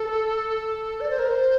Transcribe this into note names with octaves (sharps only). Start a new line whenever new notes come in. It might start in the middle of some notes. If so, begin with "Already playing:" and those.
Already playing: A4
D5
C5
A#4
C5